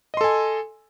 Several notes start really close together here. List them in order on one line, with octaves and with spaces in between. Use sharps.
D#5 C6 A4 G#5